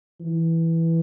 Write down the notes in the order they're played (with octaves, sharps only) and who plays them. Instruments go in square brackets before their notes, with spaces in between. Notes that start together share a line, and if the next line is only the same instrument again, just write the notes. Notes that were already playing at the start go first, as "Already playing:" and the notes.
[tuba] E3